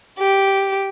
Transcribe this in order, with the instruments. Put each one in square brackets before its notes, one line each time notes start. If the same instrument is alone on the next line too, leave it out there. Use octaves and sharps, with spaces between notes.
[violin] G4